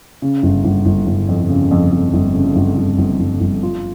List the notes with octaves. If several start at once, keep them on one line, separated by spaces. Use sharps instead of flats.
C#3
G1
G1
G1
G1
F2
C#3
F2
F2
G1
C#3
G1
G1
G1
G1
G1
F4